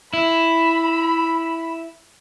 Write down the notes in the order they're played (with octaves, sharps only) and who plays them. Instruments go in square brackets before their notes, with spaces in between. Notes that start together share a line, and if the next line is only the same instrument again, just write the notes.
[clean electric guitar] E4 [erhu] B5